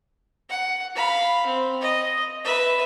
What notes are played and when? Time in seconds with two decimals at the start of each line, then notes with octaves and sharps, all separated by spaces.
0.50 F#5
0.95 F5 B5
1.46 C4
1.81 D#5
2.44 B4 E5